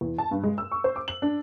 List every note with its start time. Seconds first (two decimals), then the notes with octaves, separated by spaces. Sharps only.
0.01 E2
0.18 A5
0.31 G2
0.43 G#3
0.58 E6
0.72 C#6
0.84 C5
0.96 D6
1.08 F#7
1.22 D4